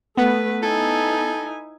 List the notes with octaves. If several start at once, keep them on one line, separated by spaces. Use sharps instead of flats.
A3 B3 B4
D#4 E4 A4 G#5